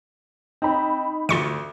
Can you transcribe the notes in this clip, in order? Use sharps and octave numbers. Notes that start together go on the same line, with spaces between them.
C4 D#4 B5
D2 F4 C6 C#7